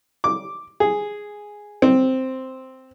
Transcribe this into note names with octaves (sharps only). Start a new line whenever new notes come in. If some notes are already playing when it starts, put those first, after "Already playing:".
D6
G#4
C4